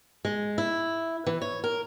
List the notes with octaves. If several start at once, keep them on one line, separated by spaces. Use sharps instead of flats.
G#3
E4
E3
C#5
A#4